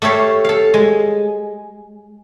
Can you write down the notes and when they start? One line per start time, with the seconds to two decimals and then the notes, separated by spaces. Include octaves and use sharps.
0.02 A3 G4 A4 C#5 F5
0.45 A4 F5
0.74 G#3